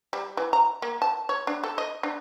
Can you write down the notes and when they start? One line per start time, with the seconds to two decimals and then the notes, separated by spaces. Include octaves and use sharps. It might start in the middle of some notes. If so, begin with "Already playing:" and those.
0.13 G3
0.37 E3
0.53 A#5
0.82 A#3
1.02 A5
1.29 C#5
1.47 D4
1.64 A4
1.78 D#5
2.03 D4